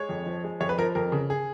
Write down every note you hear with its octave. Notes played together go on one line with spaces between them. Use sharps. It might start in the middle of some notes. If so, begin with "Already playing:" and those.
Already playing: G#3 C#5
F2
F3
G#3
F2 C#5
B4
F3 A#4
F2 A#4
C#3
G#4